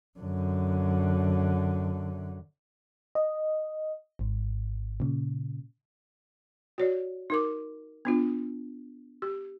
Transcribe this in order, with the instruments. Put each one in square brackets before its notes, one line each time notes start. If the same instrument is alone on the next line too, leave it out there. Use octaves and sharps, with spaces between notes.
[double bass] F#2 D3
[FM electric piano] D#5
G#1 G#2
A#2 C#3
[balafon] F#4 C#5 D5
D#4 A#4 D6
B3 D4 F4
G4